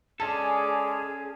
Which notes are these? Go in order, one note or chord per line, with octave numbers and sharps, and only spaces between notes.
G#3 C#4 G#4 A4 D5 A5